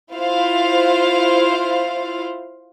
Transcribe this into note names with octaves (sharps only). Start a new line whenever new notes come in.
E4 F4 C5 F5